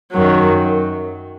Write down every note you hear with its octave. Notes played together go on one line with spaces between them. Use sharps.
F#2 D#3 F#3